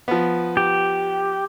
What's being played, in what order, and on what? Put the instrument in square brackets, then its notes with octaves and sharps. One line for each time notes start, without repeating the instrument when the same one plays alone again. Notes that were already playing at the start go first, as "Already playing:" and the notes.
[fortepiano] F3 B3
[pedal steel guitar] G4